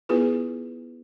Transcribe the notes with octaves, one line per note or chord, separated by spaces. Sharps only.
B3 E4 F4 G#4 B4